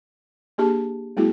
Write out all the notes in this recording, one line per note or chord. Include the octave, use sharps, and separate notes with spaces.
A#3 D4 G4 G#4 A5
G3 A3 B3 E4 F#4 G#4